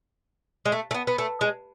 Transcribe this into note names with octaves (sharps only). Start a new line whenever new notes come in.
G#3
A3
A3
B3
B3
A3
G#3